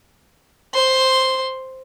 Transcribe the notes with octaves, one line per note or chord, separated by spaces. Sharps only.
C5 C6